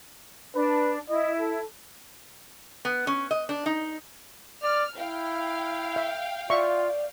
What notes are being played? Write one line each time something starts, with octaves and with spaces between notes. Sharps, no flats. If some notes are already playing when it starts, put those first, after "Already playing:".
D4 B4
E4 D#5
A4
B3
C#4
D#5
D4
D#4
D5 F6
E4 F5 G5
E5
F4 D5 E5 C#6